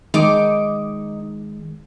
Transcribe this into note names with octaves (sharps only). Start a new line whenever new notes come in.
D#3 G#3 D#4 D6